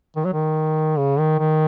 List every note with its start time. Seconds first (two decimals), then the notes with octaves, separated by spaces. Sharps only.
0.16 D#3
0.25 F#3
0.34 D#3
0.98 C#3
1.19 D#3
1.40 D#3